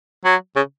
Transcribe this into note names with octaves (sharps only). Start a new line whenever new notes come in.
F#3
C#3